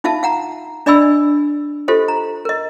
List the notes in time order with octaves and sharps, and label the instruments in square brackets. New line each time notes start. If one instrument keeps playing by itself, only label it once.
[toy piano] D#4 F4 E5 F5 A5
F5 F#5 A#5
D4 D5 D#5 G#5 B5 E6
F4 G4 A4 C5 D#5
A#5
A#4 D#5